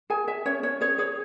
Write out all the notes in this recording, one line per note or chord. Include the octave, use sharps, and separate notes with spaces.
G#4 G#5
G#4 E5
C#4 C#5
C#4 C#5
G#4 C#5
G#4 C#5